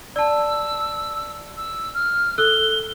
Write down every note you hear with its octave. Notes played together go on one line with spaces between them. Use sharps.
D5 A5 E6
E6
F6
A4 E6 F#6 G7